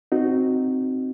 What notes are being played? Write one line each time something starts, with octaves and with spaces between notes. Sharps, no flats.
C4 D#4 F#4